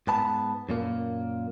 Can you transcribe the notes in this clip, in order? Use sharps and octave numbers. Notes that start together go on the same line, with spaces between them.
G#2 B3 A5 B5
F#2 A#2 A#3